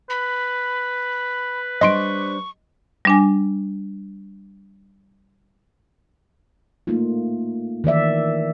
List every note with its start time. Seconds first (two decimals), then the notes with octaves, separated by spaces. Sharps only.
0.10 B4 B5
1.81 G3 D4 C5 D#5 C6 C#6 D7
3.05 G3 D4 G#5
6.87 A3 A#3 D#4 F4
7.84 D#3 E3 D5 E5